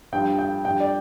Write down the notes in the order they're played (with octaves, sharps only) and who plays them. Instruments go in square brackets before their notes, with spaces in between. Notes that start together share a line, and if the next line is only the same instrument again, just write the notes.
[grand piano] G2 F3 G5
G5
G2 F3 G5
D5